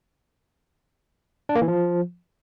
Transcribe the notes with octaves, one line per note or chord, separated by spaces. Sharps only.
D4
A#3
E3
F3